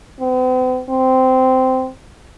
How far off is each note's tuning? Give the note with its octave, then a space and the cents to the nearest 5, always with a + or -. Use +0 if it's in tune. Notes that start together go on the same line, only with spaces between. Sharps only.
C4 -45
C4 -15